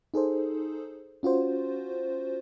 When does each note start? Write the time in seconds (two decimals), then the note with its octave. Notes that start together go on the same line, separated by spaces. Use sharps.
0.14 D#4 G#4 A4 C5
1.23 C#4 F4 F#4 C5